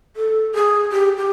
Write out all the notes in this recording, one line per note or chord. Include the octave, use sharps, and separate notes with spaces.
A4
G#4
G4
G4